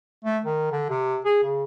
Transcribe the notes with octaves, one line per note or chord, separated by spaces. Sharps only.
A3
D#3
D3
C3
G#4
C#3